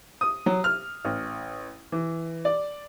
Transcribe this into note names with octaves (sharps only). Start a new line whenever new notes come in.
D#6
F#3
F6
A1
E3
D5